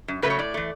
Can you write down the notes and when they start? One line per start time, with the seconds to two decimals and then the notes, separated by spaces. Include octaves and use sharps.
0.08 F#2
0.22 C#3 F#3 A3 B4
0.30 C#5
0.39 A2 D5
0.54 E3 A3